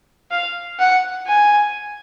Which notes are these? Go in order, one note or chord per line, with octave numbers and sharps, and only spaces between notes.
F5
F#5
G#5